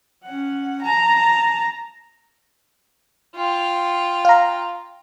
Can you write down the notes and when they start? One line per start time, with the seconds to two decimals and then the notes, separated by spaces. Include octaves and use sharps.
0.23 C#4 F#5
0.82 A5 A#5
3.36 F4 G5
4.25 F5 A#5